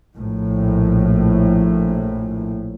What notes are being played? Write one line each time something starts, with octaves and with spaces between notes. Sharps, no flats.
A#1 A2